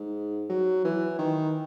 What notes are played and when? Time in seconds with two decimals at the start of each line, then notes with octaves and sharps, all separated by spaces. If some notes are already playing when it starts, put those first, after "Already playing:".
Already playing: G#2
0.49 F#3
0.84 E3
1.19 D#3